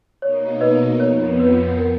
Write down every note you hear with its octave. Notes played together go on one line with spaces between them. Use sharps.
B2 A#3 D#4 C#5
B4 D#5
F2 F3 B3 C#5
B4
A#4